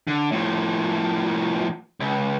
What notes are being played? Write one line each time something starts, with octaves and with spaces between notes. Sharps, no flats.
D3
A2 F3
C#2